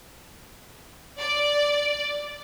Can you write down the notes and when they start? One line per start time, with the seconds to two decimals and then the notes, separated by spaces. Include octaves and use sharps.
1.20 D5